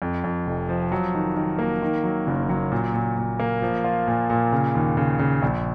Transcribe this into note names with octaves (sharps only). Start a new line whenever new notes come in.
F2
F2
F1
F3
F#3
D#3
D#3
A#3
D#3
F#3
F#1
F#3
A#2
A#2
A#2
A#3
F3
F4
A#2
A#2
C#3
D#2
C#3
C#3
A#1